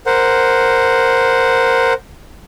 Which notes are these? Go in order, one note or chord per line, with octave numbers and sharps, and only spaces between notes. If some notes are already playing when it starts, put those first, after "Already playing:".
A#4 C5 F#5